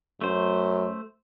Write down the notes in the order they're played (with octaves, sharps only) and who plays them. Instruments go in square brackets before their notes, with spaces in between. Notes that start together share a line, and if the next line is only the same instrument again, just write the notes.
[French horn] F#2 [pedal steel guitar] A3 C5